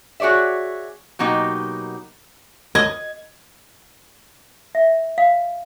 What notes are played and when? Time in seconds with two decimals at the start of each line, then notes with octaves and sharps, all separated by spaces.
0.20 F#4 G#4 C#5 D5 E5
1.19 B2 F#3 A#3 D#4 G4
2.75 D#5 G#6
4.75 E5
5.18 F5